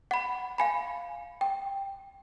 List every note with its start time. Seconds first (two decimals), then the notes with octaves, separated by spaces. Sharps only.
0.11 F#5 B5
0.58 F5 G#5 B5
1.41 G5